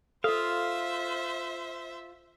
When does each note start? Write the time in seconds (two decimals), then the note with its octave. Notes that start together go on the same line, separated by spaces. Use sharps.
0.24 F4 A4 C5 E5 F5